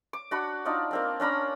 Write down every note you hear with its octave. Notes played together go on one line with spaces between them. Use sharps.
D6
D4 F#4 F#5 B5
D4 D#4 F4 D5
A#3 C4 D4
C#4 D4 A#5 B5